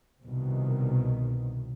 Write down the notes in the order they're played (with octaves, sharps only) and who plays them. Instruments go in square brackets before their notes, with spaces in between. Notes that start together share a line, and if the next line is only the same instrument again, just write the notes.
[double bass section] C2 B2 D#3